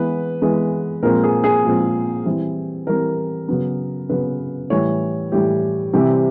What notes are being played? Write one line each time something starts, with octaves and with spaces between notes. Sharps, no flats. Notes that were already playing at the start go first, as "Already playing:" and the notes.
Already playing: E3 G#3 B3 B4
E3 G#3 B3
A#2 F3 G#3 C4 A#4
G#4
G#4
A#2 F3 G#3 C4
E3 G3 C4
E3 G3 C4 A#4
C#3 F#3 B3
C#3 F#3 B3 B4
A2 E3 G3 C#5
A2 E3 G3 G4
C3 E3 G3 C4 G4